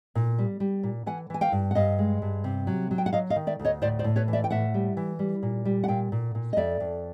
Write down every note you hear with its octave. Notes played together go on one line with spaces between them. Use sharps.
A#2
G3
G3
A#2
E3 F#5 G#5
E3 G#5
F5 G5
G2
F#5
G2 D#5 F5
G#3
G2
C3
F#3
F#3
G5
F#5
F#3 D#5 F5
D#5 F5
D#3
D5 E5
D2
C#5 D#5
A2 C5 D5
C5 D5
A2
B4 C#5
E3
D5 E5
G5
A2 E5 F#5
G3
E3
G3
A#2
G3
F#5
A#2 F5 G5
A#2
A#2
D#5
F2 D5 E5
F2